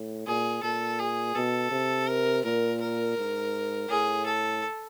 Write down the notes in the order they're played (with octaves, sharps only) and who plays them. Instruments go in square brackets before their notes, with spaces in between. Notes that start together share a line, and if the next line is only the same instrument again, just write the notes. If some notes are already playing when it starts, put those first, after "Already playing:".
Already playing: [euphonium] A2
[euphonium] A#2 [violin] G#4
[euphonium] A#2 [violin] A4
[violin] G#4
[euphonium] B2 [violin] A4
[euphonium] C3
[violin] A#4
[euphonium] A#2 [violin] A#4
[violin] A#4
[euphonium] G#2
[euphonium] A2 [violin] G#4
[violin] A4